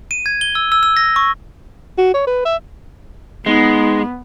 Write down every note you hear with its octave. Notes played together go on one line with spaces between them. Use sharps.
D#7
G#6
G7
E6
E6
E6
A#6
C#6
F#4
C#5
B4
E5
G#3 B3 D#4